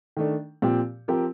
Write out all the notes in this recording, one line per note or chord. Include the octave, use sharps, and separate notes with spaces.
D#3 A3 D4
A#2 F3 C4 G4
F3 C4 G4 A#4